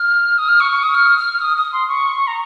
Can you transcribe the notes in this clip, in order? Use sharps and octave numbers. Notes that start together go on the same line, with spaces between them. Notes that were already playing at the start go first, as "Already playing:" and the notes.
Already playing: F6
D#6
F6
C#6
C#6
D#6
F6
F6
D#6
D#6
C6
C#6
A#5